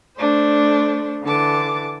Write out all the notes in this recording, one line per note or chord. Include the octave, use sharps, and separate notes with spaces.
A3 D4 C5
D3 E3 A5 D6